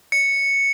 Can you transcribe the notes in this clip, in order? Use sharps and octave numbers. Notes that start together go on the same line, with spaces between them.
C#7